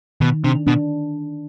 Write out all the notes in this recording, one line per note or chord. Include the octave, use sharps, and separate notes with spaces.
B2 D#3
C3 D4
B2 D4